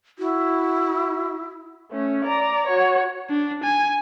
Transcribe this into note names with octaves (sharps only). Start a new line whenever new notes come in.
E4 F#4
A3 C#4
D5 A#5
F#4 C#5
D4
G#5